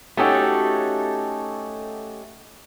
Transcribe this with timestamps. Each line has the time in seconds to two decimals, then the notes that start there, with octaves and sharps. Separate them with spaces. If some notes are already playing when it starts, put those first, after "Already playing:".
0.17 A3 C#4 D#4 F#4 G4 A4